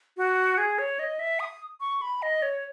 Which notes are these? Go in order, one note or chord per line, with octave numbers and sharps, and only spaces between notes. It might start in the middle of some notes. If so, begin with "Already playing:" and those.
F#4
G#4
C#5
D#5
E5
D#6
C#6
B5
D#5
C#5